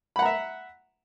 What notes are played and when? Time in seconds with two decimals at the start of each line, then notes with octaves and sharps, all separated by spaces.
0.16 B5
0.19 F#5
0.22 A#5
0.25 E5